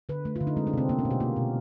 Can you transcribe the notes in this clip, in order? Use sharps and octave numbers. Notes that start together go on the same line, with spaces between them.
D3 B4
A3
F4
D3
D#4
G#3 C4
D4
C3 C4
A#3 B3
C#4
B2
G4
A#3 F4
B2